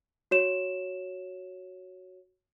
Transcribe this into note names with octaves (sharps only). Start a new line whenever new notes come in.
F#4 C#5 E7